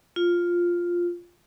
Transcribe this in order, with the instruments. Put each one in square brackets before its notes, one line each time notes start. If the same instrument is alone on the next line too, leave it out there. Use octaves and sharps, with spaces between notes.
[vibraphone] F4